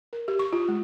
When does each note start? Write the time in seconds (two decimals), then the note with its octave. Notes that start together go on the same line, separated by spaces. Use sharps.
0.13 A#4
0.28 G4
0.39 C#6
0.53 F4
0.69 G#3